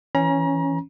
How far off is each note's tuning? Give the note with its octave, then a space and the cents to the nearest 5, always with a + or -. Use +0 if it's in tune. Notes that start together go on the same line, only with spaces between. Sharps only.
E3 +0 C#4 -5 A#5 +35